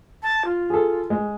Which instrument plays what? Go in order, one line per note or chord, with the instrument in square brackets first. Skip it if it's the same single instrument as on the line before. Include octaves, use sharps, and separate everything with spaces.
[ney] A5
F4
[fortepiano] G#4 A4
G#3